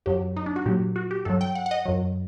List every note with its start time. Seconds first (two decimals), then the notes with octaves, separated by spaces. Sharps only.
0.06 F#2 F#3 G4
0.37 D#4
0.46 D4
0.56 F#4
0.66 A#2 F#3 G4
0.96 F#4
1.11 G4
1.25 G2 F#3 A4
1.41 G5
1.55 F#5
1.66 F#5
1.71 D#5
1.85 F#2 F#3